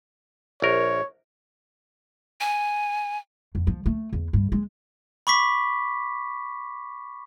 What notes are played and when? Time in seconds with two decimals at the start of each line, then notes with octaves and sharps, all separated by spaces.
0.62 A#1 A#4 C#5
2.41 G#5
3.55 F2
3.67 F3
3.86 A3
4.13 E2
4.33 G2
4.52 G#3
5.27 B5 C#6 D6 B6